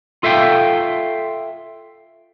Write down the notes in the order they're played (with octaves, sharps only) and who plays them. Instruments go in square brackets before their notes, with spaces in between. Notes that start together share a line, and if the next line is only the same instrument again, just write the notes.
[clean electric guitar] F4 A4 E5 F5 G5